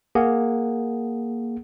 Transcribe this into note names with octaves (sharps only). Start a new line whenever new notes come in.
A#3 G#4 F#5